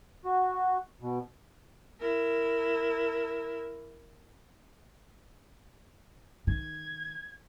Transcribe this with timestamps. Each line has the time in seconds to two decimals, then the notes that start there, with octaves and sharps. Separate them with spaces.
0.25 F#4
1.02 B2
2.00 E4 A#4
6.47 D#3 G#6